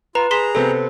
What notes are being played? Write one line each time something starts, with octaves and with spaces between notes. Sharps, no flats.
F4 B4 A#5
G#4 A#5 C6 B6 E7
C3 B3 C4 A4